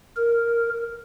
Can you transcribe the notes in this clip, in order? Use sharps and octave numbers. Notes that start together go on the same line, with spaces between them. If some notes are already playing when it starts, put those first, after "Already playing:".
A#4